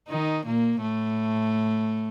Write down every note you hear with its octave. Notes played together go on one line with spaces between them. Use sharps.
D#3 D#4
A#2 A#3
A2 A3